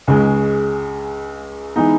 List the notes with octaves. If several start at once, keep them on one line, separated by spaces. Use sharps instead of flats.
C#2 C#3 G#3
E3 G#3 B3 D#4